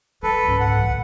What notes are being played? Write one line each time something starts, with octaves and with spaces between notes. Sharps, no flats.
F#3 A4 B4
C#2 G#2
F#5
C2 A#2